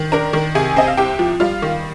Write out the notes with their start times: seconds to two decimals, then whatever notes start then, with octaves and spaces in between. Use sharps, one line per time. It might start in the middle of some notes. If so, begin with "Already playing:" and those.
Already playing: D#3
0.12 D4 A#4 A#5
0.33 D#3
0.55 C3 G#4 G#5
0.76 C4 D#5
0.87 F5
0.97 C2 G4 G5
1.19 F3
1.40 G3 F4 F5
1.62 D#3